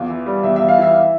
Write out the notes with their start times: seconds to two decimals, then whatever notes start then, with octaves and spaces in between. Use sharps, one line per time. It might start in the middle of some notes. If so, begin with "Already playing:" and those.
Already playing: E2 F4
0.10 E3
0.26 G3
0.43 E2 E5
0.56 E2 E5
0.68 F5
0.78 E3 E5